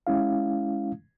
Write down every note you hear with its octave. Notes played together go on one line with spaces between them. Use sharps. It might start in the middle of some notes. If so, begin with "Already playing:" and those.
G#3 C#4 E4 F5